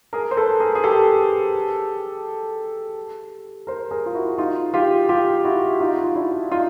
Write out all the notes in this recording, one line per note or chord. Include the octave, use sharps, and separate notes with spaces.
G#4 A#4
C5
A4 B4
G#4 A#4
G#4
G4 A4
A#4 C5
G#4 A#4
F4
E4 F#4
D#4 F4
F4 G4
F4 G4
E4 F#4
D#4 F4
F#4
F4
D4 E4
D#4 F4